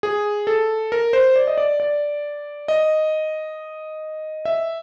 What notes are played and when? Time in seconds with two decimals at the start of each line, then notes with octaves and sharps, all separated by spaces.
0.03 G#4
0.47 A4
0.92 A#4
1.13 C5
1.36 D5
1.47 D#5
1.58 D5
1.80 D5
2.68 D#5
4.45 E5